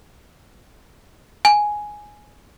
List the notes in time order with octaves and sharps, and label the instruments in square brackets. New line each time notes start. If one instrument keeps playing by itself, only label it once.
[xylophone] G#5